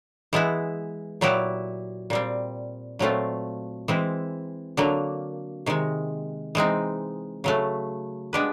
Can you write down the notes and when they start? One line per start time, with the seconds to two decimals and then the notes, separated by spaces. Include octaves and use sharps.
0.33 E3 G#3 B3 E4
1.21 A#2 F#3 B3 E4 G4
2.10 A#2 G3 C4
2.99 A#2 F#3 A3 C4 F4
3.88 E3 G#3 C4 E4
4.77 D3 F#3 A#3
5.66 C3 D#3 G#3
6.55 E3 G#3 C4 D#4
7.44 C#3 F#3 A3
8.33 G#3 B3 D4 G4 B4